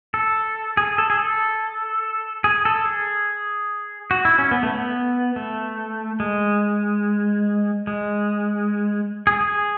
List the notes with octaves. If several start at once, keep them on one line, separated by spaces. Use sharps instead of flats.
A4
G#4
A4
G#4
A4
G#4
A4
G#4
F#4
E4
C#4
B3
A3
B3
A3
G#3
G#3
G#4
G#4